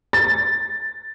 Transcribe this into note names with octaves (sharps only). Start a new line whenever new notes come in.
A6